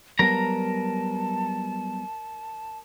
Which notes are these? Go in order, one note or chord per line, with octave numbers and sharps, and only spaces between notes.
F#3 G3 B3 A#4 A5 A#5